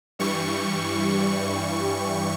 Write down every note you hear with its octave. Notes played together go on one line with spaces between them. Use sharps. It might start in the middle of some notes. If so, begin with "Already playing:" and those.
G2 E3 G3 C#6